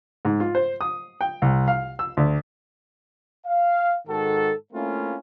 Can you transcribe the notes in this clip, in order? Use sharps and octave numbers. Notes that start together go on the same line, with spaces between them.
G#2
F4
C5
D#6
G5
C2
F5
E6
D2
F5
G#2 D#3 F#4 A4
A3 A#3 C4 C#4 E4 F4